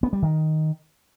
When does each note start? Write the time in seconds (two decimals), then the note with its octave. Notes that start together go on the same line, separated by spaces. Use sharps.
0.03 B3
0.13 G3
0.23 D#3